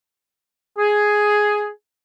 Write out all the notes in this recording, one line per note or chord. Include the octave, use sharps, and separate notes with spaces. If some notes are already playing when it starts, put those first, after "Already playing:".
G#4